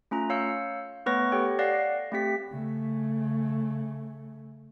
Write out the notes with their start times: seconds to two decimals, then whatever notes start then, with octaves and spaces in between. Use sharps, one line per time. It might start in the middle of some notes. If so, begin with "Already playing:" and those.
0.11 A3 C#4 F4 A#5
0.30 C#5 F5 E6 G6 C#7
1.06 A3 B3 B4 C#5 C#6 A#6
1.32 G4 A4 C#5 G5
1.59 D5 F5 F#5 F#6 A#6 C7
2.12 A3 C4 G4 B6
2.50 C#3 A3